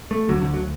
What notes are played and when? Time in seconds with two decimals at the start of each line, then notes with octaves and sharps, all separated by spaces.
0.11 A3
0.29 D2 D3 F#3
0.42 D3
0.54 F#3